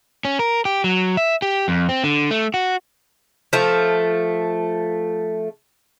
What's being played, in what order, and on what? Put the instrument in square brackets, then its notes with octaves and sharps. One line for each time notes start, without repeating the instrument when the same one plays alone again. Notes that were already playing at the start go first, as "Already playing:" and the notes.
[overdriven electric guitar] C#4
A#4
G4
F#3
E5
G4
F2
C4
D3
A3
F#4
[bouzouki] F3 A3